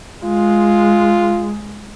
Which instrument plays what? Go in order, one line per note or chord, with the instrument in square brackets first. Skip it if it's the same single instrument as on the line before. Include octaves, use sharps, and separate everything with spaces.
[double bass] G#3 [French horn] F4